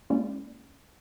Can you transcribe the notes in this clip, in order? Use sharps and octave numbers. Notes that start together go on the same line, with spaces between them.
G#3 A#3 C#4 E4 D5